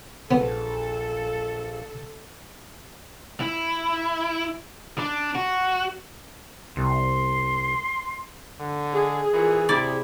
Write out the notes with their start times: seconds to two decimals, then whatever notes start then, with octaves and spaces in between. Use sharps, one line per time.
0.31 A#1 B3 A4
3.40 E4
4.98 D4
5.35 F#4
6.76 C2 C6
8.60 D3
8.92 G#3 G#4
9.33 A#2 E3
9.69 C3 E4 D5